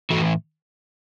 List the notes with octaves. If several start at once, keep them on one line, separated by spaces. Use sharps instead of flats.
A2 E3 F#4 A4